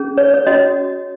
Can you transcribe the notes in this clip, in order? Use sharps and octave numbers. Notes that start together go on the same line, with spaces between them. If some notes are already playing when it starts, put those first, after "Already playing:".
Already playing: C#4 G#4
C#5
C#5
C#4 F#4 C#5 D#5